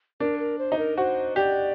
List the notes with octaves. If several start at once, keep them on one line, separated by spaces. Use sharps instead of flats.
D4 A#4
A#4
C5
D#4
A#4
F#4 C5
G4 D5